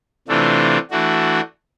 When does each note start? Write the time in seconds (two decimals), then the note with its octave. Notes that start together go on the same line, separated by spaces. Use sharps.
0.28 C3 E3 A3 D4 F4
0.90 E3 A3 D4 F#4